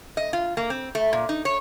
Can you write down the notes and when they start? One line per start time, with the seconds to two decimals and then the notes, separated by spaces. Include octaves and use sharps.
0.17 D#5
0.33 F4
0.57 A#3
0.70 C4
0.95 A3
1.13 A#2
1.29 D#4
1.45 C#5